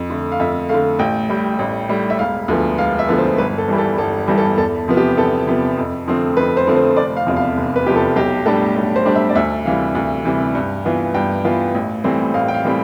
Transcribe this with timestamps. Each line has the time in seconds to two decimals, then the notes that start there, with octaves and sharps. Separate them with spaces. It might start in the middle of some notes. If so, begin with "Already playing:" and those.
Already playing: F2
0.10 D3 A3
0.32 F5
0.39 F2 E5
0.69 D3 A3 F5
0.99 A1 G5
1.29 A2 G3
1.59 A1
1.89 A2 G3
2.10 E5
2.19 E1 F5
2.48 D2 D3 F3 B3
2.78 E1 F5
2.99 E5
3.08 D2 D3 F3 B3
3.18 C5
3.38 G1 B4
3.58 A4
3.68 G2 E3 G3
3.78 A4
3.98 G1 A4
4.27 G2 E3 G3
4.38 A4
4.57 E2 A4
4.88 C3 F3 B3
4.97 G4
5.17 E2 A4
5.47 C3 F3 B3
5.77 F2
6.07 D3 F3 A3 C4
6.37 F2 B4
6.57 C5
6.67 D3 F3 A3 C4
6.76 C5
6.96 F1 D5
7.17 F5
7.26 E2 C3 F3
7.36 F5
7.57 F1
7.76 B4
7.86 E2 C3 F3 G4
7.96 A4
8.16 B1 G4
8.46 A2 G3 D4 A4
8.76 B1
8.96 C5
9.05 A2 G3 D4
9.15 E5
9.29 D5
9.35 D2 E5
9.65 C3 E3 G3 F5
9.95 D2
10.25 C3 E3 G3
10.55 G2
10.85 E3 B3 F4
11.14 G2 G5
11.44 E3 B3 F4
11.74 A1
12.04 A2 E3 G3 C4
12.34 A1 F5
12.48 G5
12.54 F5
12.64 A2 E3 G3 C4